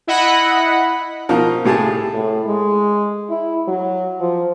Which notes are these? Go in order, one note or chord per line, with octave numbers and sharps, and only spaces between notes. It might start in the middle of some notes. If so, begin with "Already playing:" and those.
E4 D#5 F#5 B5
B2 F3 D#4 A#4 F5
C2 A2 G4 G#4 A5
A2
G#3
E4
F#3
F3